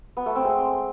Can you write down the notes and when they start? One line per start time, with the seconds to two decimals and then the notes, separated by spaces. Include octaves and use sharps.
0.17 B3
0.26 A3
0.35 C4
0.45 G#3